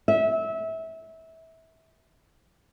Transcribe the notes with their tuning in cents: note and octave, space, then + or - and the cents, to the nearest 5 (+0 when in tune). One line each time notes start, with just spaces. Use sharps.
E5 -25